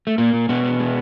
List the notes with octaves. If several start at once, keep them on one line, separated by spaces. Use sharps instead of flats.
A3
A#2 A#3
A#2
B2 G#3 B3
G#3
G#3